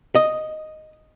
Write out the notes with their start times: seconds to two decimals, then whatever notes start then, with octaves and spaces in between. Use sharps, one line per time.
0.15 D#5